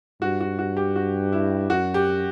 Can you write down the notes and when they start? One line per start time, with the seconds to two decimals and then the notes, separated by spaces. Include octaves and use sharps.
0.22 G2 F#4
0.41 F#4
0.59 F#4
0.77 G4
0.96 F#4
1.32 E4
1.70 F#2 F#4
1.94 G4